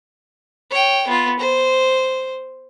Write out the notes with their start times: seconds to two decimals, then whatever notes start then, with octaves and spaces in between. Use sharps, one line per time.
0.70 C#5 G5
1.07 B3 F4
1.39 C5